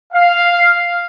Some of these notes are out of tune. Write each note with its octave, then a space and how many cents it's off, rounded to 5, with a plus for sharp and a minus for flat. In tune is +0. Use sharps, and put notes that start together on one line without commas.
F5 +0